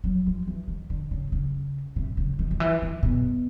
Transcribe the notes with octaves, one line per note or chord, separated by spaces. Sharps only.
F#3
F3
E3
D#3
D3
C#3
C#3
C3
C#3
D#3
D#3
E3
D#3
B2